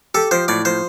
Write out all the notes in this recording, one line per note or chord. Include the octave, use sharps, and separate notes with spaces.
G4 A4
F3 C5
A2 D5
F3 C5